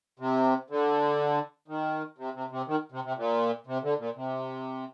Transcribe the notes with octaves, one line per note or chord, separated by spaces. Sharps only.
C3
D3
D#3
C3
C3
C3
D#3
C3
C3
A#2
C3
D3
A#2
C3